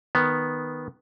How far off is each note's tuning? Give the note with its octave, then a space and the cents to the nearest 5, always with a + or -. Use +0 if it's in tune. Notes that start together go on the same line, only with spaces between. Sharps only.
D#3 +0 B3 +0